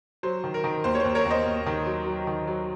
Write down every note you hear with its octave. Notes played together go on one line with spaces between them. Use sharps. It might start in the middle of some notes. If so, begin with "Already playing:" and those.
F#3 C5
D#3
A#4
D#3
D#2 C5
C#5
D#2 C5
A#4 C#5
D#2
C5 D#5
D#2
D#3
F#3
F#3
D#3
F#3